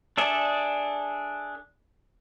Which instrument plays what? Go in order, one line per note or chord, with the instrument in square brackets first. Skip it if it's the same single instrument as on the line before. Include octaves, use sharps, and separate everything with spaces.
[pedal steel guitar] D4 G#4 A4 D5 E5